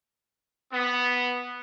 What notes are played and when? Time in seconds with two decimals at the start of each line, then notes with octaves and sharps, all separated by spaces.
0.73 B3